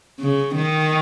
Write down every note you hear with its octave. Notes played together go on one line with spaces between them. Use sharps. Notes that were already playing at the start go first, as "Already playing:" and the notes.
C#3
D#3